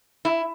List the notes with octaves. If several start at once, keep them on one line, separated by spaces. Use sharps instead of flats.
E4